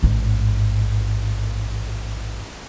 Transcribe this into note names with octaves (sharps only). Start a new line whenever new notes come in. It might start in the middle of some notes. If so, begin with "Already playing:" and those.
A1 G#2